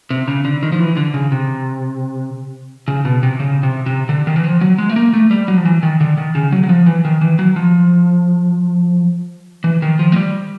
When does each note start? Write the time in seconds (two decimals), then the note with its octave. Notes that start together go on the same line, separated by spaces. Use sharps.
0.10 C3
0.28 C#3
0.45 D3
0.63 D#3
0.72 F3
0.80 E3
0.97 D3
1.14 C#3
1.32 C3
2.88 C#3
3.05 B2
3.23 C3
3.40 C#3
3.63 C3
3.86 C3
4.09 D3
4.27 D#3
4.36 E3
4.44 F3
4.61 F#3
4.78 G#3
4.89 A3
4.96 A#3
5.13 A3
5.31 G3
5.48 F#3
5.57 F3
5.65 E3
5.83 D#3
6.01 D3
6.18 D#3
6.35 C#3
6.52 F#3
6.63 F#3
6.69 F3
6.86 E3
7.05 D#3
7.21 E3
7.39 F#3
7.56 F3
9.64 E3
9.82 D#3
9.99 F3
10.12 G#3
10.16 G3